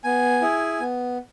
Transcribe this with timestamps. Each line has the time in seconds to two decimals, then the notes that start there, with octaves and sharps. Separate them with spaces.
0.04 B3 G#5
0.42 E4 G#4
0.80 B3